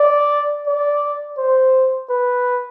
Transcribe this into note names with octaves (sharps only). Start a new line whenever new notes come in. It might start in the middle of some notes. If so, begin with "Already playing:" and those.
Already playing: D5
D5
C5
B4